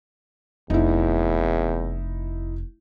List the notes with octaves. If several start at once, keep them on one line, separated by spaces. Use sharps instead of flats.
F1 E2 D#4 E4